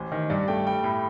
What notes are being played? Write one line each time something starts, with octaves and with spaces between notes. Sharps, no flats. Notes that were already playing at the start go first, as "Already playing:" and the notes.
Already playing: A1 C5
D#3
G2 D5
A3 G5
G3 G5
A2